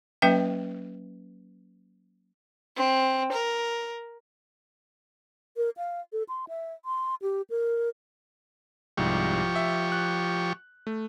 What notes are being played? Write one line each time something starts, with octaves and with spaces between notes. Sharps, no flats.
F#3 A#3 C#4 B4 E5 G5
C4
A#4
A#4
F5
A4
C6
E5
C6
G4
A#4
C2 G#2 F3 G4 C#6
E5
F#6
A3